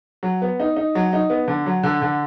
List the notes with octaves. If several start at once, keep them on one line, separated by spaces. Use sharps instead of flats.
F#3
B3
D#4
D#4
F#3
D#4
B3
D3
F#3
D3
D3